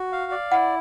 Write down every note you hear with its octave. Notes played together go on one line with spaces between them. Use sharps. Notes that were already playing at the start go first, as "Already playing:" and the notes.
Already playing: F#4
F5
D5
E4 F#5